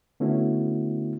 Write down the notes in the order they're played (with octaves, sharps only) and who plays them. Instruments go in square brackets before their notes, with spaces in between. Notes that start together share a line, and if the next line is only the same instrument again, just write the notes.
[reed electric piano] D3 A3 B3 C#4 E4 F#4